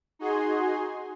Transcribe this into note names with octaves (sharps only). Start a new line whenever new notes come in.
D#4 F#4 G#4 G#5 C6